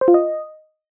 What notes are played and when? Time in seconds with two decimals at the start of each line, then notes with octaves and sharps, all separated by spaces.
0.01 C5
0.08 F4
0.14 D#5